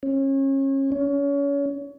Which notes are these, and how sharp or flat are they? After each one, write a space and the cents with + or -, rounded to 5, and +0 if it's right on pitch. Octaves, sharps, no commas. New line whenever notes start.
C#4 -30
C#4 +30